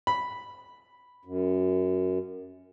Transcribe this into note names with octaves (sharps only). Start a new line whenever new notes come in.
B5
F#2